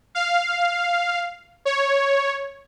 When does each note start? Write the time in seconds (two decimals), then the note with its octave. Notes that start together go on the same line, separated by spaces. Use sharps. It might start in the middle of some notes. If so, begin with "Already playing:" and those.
0.15 F5
1.65 C#5